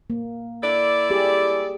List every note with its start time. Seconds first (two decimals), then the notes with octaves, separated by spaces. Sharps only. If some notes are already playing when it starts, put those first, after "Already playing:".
0.10 A#3
0.62 E4 A4 D5
1.10 G4 G#4